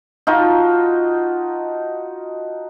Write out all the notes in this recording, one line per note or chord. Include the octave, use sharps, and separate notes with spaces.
D#4 F4 F#4 A5